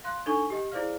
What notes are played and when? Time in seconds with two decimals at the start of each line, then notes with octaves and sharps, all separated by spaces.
0.04 F5 C6 F#6
0.26 D4 D#4 A4 G#5 C#6 G7
0.50 G4 D#5 G5
0.72 E4 G#4 C5 D5 F5 F6